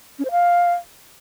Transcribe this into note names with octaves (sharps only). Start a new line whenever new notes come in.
C#4
C5
F5